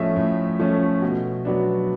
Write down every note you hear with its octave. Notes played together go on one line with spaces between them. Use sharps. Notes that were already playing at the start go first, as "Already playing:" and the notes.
Already playing: A2 F3 A3 C#4 D#5 E5
A2
F3 A3 C#4
B2
F#3 B3 D4